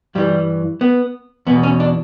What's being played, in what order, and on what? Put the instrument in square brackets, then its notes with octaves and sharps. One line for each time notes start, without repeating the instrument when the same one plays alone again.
[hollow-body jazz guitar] G2 E3 G3
B3
E2 B3
B2
C#4
D4